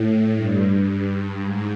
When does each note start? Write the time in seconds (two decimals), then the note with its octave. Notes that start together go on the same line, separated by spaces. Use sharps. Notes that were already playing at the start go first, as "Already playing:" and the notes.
Already playing: A2
0.36 G2
0.89 G2
1.43 G#2